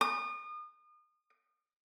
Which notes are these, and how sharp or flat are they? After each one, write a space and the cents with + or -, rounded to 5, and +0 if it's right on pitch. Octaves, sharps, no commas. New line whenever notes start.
D#6 -35